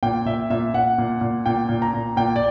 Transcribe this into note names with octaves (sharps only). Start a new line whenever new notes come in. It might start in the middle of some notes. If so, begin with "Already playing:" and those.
A#2 G5
A#2 E5
A#2 E5
A#2 F#5
A#2
A#2
A#2 G5
A#2
A#5
A#2
A#2 G5
D5